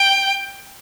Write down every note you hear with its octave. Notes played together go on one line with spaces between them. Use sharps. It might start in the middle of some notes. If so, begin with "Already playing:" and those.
Already playing: G5